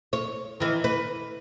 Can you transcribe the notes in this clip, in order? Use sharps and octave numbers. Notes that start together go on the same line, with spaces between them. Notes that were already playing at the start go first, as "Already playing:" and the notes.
C#5
D#3 E3
B4